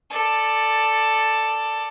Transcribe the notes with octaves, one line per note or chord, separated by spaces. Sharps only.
A4 D5